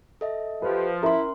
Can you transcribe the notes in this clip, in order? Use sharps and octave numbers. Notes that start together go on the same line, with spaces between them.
A4 D#5 E5
F3 G4 B4
C#4 E4 A#4 E5 C6